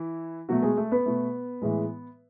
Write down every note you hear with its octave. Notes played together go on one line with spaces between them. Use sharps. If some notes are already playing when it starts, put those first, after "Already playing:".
Already playing: E3 E4
B2 F#3 A3 F#4
G#3 G#4
A3 A4
B3 B4
B2 A3
A2 E3 G#3